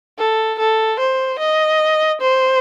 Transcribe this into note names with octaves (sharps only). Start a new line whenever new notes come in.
A4
A4
C5
D#5
C5